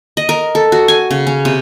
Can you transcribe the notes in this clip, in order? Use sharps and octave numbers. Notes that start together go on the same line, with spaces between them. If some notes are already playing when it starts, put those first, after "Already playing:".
D#5
A#4
A4
F#4
G#5
C#3
C#4
C3